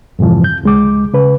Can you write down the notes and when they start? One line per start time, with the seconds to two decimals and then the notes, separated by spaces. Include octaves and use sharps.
0.19 F2 G#2 C3 E3 F3
0.44 G6
0.63 C#2 G#3 D6
1.14 C#3 B4